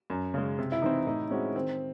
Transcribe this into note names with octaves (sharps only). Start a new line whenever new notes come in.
F#2
C#3 G#3
C3
E4
E3 C4 D#4
A2 D#4
G#3 C4 C#4 F#4
D#3 C4